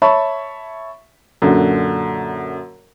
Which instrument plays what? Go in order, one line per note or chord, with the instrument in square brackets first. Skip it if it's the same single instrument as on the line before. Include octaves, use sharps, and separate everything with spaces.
[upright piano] C#5 E5 A5 B5 C#6
F#2 A#2 D3